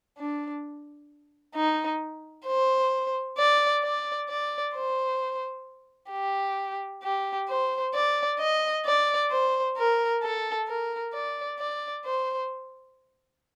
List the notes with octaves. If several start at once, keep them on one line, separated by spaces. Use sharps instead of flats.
D4
D#4
C5
D5
D5
D5
C5
G4
G4
C5
D5
D#5
D5
C5
A#4
A4
A#4
D5
D5
C5